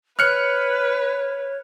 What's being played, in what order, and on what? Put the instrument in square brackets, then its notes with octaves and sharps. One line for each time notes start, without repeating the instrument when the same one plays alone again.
[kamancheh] B4 [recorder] C#5 [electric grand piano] F6 F#6 C#7